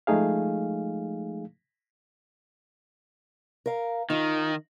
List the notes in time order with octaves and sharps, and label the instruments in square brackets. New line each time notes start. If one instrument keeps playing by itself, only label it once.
[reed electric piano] F3 G#3 A3 D#4 G#4 F5
[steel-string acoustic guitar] A#4 F5
[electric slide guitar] D#3 [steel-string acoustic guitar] D#4 F4